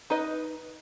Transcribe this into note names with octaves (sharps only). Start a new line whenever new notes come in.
D#4 B4 D#5